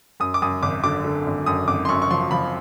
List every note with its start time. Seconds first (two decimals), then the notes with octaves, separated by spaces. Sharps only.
0.20 F#2 D#6
0.34 D6
0.42 F#2 D#6
0.62 G#1 D6
0.84 D3 D6
1.04 D3
1.27 G#1
1.46 F#2 D#6
1.68 G#1 D6
1.85 C6
1.89 F#2 C#6
2.02 C#6
2.11 F3 C6
2.31 F3 B5